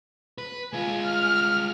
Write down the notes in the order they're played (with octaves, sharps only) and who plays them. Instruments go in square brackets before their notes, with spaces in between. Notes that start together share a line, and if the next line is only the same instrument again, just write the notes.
[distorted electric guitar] B4
[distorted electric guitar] G#3 F4 [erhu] G#5
[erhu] F6